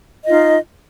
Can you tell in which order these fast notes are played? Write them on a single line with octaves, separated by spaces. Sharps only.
D#5 F4 D#4